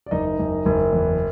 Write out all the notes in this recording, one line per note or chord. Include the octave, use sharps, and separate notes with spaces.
D5
F#1 D#4 D#5
F#1
F#1
E2